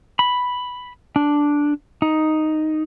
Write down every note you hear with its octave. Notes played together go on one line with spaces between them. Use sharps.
B5
D4
D#4